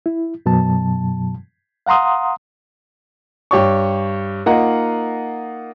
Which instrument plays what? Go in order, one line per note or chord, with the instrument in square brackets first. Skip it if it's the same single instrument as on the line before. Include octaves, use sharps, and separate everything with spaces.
[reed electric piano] E4
F#2 B2 F#3 A5
F5 F#5 A#5 C6 D#6
[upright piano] G2 G4 C#5 C#6
A#3 D#4 F4 D#5 F#5